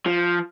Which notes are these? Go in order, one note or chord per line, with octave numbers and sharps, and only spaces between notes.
F3